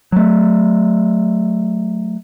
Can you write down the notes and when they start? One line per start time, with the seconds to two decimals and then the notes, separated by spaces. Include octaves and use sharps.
0.12 F#3 A3